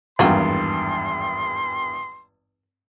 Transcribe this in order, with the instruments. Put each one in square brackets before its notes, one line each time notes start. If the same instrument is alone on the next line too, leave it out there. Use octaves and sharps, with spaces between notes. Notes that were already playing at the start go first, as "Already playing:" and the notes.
[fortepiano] G#1 E2 G2 [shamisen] A#3 F4 F#4 [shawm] C6